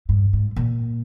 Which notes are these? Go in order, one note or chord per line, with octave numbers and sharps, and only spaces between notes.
G2
G#2
A#2